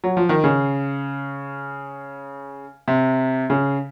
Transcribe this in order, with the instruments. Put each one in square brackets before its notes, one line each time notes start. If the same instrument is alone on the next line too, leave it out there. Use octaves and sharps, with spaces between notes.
[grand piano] F#3
F3
D#3
C#3
C3
C#3